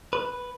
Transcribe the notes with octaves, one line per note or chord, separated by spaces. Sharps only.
B4